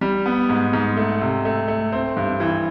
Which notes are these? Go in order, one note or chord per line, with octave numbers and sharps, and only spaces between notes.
G3
B3
G#2
G#2
A3
C3
A3
A3
C4
G2
E3